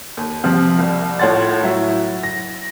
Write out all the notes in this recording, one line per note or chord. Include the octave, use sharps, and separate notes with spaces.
D#2
C3 F3 C4 F4
C2
A2 F4 C#5 F#5 C6 A6
F#3 E4
A#6